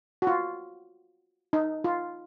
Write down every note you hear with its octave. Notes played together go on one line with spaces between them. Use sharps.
F#4
F4
D#4
F4